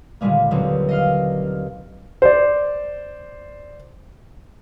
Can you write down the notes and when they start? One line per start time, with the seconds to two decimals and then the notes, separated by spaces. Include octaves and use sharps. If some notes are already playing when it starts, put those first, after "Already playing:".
0.21 A#2 D3 D#3 G3 G#3 A#3
0.51 D#2 B2 D3 F#3 C4
0.89 D#5 F5 F6
2.22 C5 D5